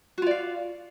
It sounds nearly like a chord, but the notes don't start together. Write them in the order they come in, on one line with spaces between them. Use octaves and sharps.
F#4 F4 D5 F5